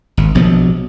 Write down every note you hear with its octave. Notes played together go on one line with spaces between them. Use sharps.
G#1
A#1 B2 F3 F#3